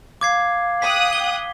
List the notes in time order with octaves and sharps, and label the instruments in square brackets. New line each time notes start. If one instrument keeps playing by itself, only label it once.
[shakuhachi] F5 [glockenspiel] D6 G#6 C7
[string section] G5 D#6 F#6 [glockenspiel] B6
[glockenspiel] G7